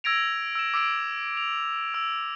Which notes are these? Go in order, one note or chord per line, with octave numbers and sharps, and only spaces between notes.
E6 G#6 A#6 D7 F7
E6 E7
D6 E6 A#6 D7 F7
F7
E6